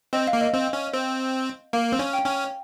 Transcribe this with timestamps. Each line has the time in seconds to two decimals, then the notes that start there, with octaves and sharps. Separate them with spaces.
0.13 C4 D#5
0.28 F5
0.33 A#3
0.41 D#5
0.53 C4
0.73 C#4
0.93 C4
1.73 A#3 F5
1.92 C4
1.99 C#4
2.13 G5
2.26 C#4